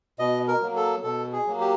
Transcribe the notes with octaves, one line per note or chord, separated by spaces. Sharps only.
B2 D#5
A#4
F#3 A#3
A4
B2 A4
G#4
F#3 A#3
G4